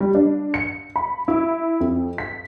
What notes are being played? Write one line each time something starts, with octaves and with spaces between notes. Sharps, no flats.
G3
D4
C#7
B5
E4
F2
B6